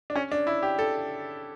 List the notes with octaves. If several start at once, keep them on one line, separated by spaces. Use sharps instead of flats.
D4
C#4
D4
E4
G4
A4